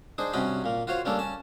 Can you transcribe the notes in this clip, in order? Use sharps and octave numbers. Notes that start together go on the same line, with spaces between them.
D4 D#4 G#4 C5
G2 C3 C#4 F#4 D#5 B5
A#2 A#3
F4 F#4 C5 C#5 F5
G3 A#3 C#4 D4 A4
C#4 A5